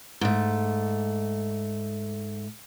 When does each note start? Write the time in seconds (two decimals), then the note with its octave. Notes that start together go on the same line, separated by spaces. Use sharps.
0.21 G#2 A3